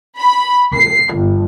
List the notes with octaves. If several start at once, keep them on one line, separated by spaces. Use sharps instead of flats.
B5
C7
G1